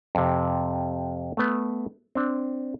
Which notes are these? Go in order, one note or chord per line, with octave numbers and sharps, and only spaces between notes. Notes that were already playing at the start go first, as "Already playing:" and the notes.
F2 C3
A3 B3
C4 D4